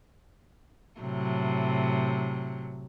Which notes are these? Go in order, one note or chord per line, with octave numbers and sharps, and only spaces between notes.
A2 C3 F#3